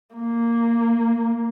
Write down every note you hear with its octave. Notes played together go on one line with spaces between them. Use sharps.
A#3